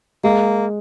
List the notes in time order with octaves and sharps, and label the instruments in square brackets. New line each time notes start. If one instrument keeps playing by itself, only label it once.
[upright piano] G#3 [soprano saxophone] A#3